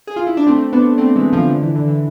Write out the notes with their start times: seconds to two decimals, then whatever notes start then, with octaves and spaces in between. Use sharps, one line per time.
0.07 G#4
0.16 F4
0.27 E4
0.37 D4
0.47 A3 C4
0.73 B3 D4
0.98 A3 C4
1.16 E3 G#3
1.33 D3 F3
1.50 D3
1.63 E3
1.76 D3
1.88 E3